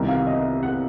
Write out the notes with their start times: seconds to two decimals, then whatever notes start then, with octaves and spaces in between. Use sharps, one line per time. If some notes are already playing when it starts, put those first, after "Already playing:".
Already playing: C2 C3 D#3
0.08 F5
0.27 D#5
0.63 F#5